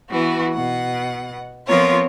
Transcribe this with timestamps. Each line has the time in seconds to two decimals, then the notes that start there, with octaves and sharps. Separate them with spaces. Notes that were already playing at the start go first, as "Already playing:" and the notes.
0.11 E3 B3 F#4
0.54 B2 F#5
1.68 F3 B3 C4 F4 A#4 C#5